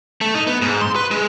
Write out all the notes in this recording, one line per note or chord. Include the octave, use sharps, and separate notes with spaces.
A3
D#4
B3
G#2
C6
B4
G#3